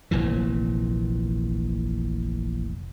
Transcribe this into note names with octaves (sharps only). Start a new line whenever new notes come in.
F1 A#1 A#2 E3